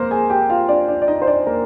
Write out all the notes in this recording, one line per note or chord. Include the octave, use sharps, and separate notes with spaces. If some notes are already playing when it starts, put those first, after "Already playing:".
Already playing: F2 G#3 A#3 A#4 C5
G#4 G#5
G4 G5
F4 F5
D4 D5
D4 D5
D5
D#4 D#5
C5
D4 D5
A#3 A#4